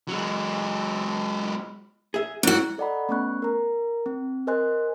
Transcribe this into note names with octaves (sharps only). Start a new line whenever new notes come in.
F#3 G#3
G#4 E5
G#2 C#4 E4 F#4
A4 D5 D#5 F#5 A#5 B5
A3 B3 C#4 C#6 F#6
A#4 A#5
C4
A#4 C5 D#5 G#5 C6 F#6